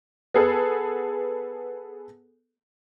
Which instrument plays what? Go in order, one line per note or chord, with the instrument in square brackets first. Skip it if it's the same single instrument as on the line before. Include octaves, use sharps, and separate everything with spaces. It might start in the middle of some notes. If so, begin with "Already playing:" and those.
[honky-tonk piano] B3 G#4 A4 B4